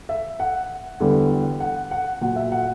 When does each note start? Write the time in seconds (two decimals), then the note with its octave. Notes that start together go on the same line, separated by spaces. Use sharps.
0.09 E5
0.40 F#5
1.00 E2 D3 G3
1.60 F#5
1.91 F#5
2.21 A#2 F#3 F#5
2.36 E5
2.52 F#5